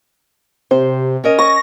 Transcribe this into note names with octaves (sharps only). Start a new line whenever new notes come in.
C3 C5
C#4 A#4 D#5
C#6 A#6